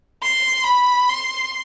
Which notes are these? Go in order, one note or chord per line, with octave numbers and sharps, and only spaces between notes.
C6
B5
C6